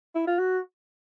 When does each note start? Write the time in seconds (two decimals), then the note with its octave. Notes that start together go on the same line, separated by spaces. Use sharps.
0.15 E4
0.27 F4
0.39 F#4